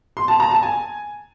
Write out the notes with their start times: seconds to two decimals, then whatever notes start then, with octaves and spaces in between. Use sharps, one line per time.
0.17 C6
0.28 A5
0.40 A#5
0.51 A5
0.63 G#5